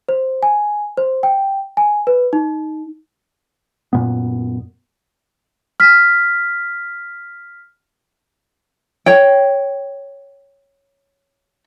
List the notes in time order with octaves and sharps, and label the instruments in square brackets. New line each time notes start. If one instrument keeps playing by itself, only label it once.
[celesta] C5
G#5
C5
G5
G#5
B4
D#4
[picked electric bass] F#2 A#2 B3
[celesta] F6 B6
[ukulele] C#5 G5